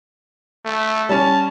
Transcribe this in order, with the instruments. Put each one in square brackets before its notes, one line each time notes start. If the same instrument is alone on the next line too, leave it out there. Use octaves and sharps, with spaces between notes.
[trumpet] A3
[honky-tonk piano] G3 C#4 [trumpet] A5